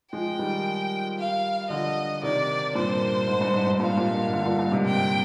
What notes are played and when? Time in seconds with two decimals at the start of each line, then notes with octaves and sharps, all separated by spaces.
0.13 F3 G#3 G5
0.39 D#3 G3
1.19 F5
1.70 D3 F3 D#5
2.23 C3 D#3 D5
2.75 G2 A#2 C5
3.28 G#2
3.41 G2
3.54 G#2
3.67 G2
3.80 G2 A#2 F5
3.97 G2 A#2
4.33 A#2 D3
4.46 G2 A#2
4.59 G2 A#2
4.72 G#2 C3
4.85 G#2 G5